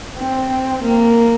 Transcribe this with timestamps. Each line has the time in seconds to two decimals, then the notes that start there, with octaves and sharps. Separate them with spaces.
0.18 C4
0.83 A#3